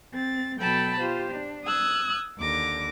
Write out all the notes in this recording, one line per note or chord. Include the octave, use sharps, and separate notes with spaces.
C4 A6
B2 F#3 A4 G5 A5 B5
F4 G4 C5
D4
D#6 E6 F#6 G#6
D#2 D3 D6 A#6